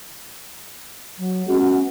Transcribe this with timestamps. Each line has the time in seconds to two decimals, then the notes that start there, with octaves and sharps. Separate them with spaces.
1.17 F#3
1.48 G#3 B3 C#4 F#4